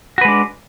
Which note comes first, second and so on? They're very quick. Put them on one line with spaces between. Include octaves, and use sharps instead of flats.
F#4 B4 G#3 D4